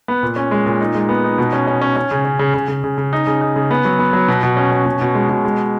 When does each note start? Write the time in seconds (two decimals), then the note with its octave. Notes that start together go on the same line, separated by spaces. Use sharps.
0.08 B3
0.23 A#2
0.36 C#4
0.51 G#3
0.66 A#2
0.80 D#4
0.95 G#3
1.09 B3
1.24 D#4
1.38 B2
1.53 C#4
1.67 C#4
1.82 C#4
1.96 C#4
2.11 C#3
2.25 C#4
2.39 C#3
2.54 C#3
2.68 C#3
2.84 C#3
2.98 C#3
3.13 D#4
3.27 C#3
3.41 D#4
3.56 C#3
3.71 B3
3.85 F#3
3.99 B3
4.13 F#3
4.28 B2
4.43 B2
4.57 C#4
4.72 C#4
4.86 B2
5.01 B2
5.15 G#3
5.29 B2
5.45 G#3